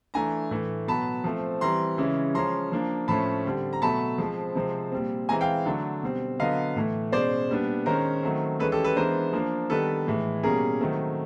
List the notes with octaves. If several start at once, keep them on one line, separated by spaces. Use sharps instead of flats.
E3 A3 D4 G#5 A#5
A2 E3 A3
B2 F#3 B3 A5 B5
F3 A3 C4
E3 G3 C4 A#5 C6
C#3 E3 G#3 C#4
F3 G#3 C#4 A#5 C6
F3 A#3 D4
A2 F3 A3 C#4 A5 B5
D3 G3 C4
A#5
B2 F#3 A3 A5 B5
F3 G#3 C4
C3 F3 G#3 C4
A#2 G3 C4
E3 G#3 C4 G#5 A#5
F5 G5
D3 F#3 A3 D4
B2 G3 C4
D3 F#3 B3 D#5 F5
A2 E3 A3
B2 G#3 C#4 C5 D5
A#2 G3 B3 D4
D#3 G#3 C#4 A#4 C5
D#3 F#3 A3 C4
E3 G#3 C#4 A4 B4
G4 A4
A4 B4
E3 G#3 B3 D4 A#4 C5
F3 A#3 D4
D#3 G3 B3 D4 A4 B4
A2 E3 G#3
B2 G3 A#3 C#4 G#4 A#4
D#3 F#3 A3 C4